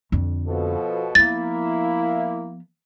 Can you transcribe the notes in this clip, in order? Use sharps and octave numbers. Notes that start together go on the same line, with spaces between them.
F2 D3
B2 F3 A4
F3 A#3 B3 E4 A6